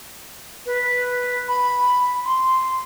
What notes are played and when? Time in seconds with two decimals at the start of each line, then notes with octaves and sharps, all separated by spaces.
0.66 B4
1.48 B5
2.25 C6